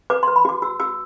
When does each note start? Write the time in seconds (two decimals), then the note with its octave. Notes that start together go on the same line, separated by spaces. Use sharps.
0.10 B4 D6
0.23 C6
0.28 B4
0.36 B5
0.45 F#4 D6
0.62 F#4 E6
0.80 F#4 E6